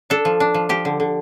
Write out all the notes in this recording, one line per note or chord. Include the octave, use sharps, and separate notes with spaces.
D4 A4
F3
D4
F3
F3 G4
D3
D3